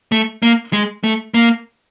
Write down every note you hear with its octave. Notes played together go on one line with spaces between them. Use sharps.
A3
A#3
G#3
A3
A#3